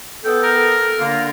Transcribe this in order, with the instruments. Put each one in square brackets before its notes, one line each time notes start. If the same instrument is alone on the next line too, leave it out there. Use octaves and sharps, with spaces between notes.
[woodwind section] B3 A4 [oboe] G5
[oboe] A#4
[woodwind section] D3 A#3 [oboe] F4